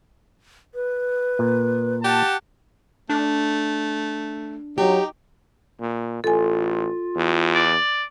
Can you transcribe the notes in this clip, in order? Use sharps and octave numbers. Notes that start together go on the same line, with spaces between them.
B4
A#2
G4 F#5 A5
A3 D4
F#3 D#4 G4
A#2
A1 F4 A4 G#5
E2
D5